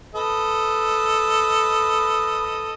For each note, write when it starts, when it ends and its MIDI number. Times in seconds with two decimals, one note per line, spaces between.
0.15 2.74 69
0.15 2.74 71
0.15 2.74 75